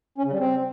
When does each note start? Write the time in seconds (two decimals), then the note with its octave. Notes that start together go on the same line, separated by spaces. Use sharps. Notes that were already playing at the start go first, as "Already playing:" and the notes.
0.18 C#4
0.25 C#3
0.32 G3
0.39 C4